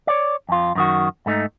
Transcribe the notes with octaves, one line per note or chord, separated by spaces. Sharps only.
C#5 D5
F2 F4
F#2 D#3 F#4
G#2 A3 D#4